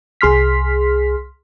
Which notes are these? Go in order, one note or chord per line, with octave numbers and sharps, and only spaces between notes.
C2 G#4 C6 F6 B6